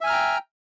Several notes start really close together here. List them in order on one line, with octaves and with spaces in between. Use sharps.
E5 G#5 F6 A#5 G5